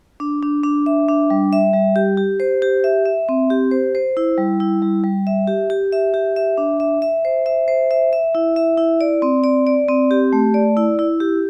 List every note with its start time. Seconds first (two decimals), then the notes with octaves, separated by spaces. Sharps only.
0.20 D4
0.43 D4
0.64 D4
0.86 E5
1.08 D4
1.30 G3
1.53 E5
1.73 G3
1.96 G4
2.17 G4
2.40 C5
2.62 G4
2.84 E5
3.05 E5
3.29 C4
3.50 G4
3.71 C5
3.95 C5
4.17 E4
4.38 G3
4.60 E4
4.82 G3
5.04 G3
5.27 E5
5.48 G4
5.70 G4
5.92 E5
6.14 G4
6.36 E5
6.58 D4
6.80 E5
7.02 E5
7.25 C5
7.46 E5
7.68 C5
7.91 E5
8.13 E5
8.35 E4
8.56 E5
8.78 E4
9.01 D5
9.22 C4
9.44 D5
9.67 D5
9.88 C4
10.11 G4
10.33 A3
10.54 D5
10.77 E4
10.99 E4
11.20 G4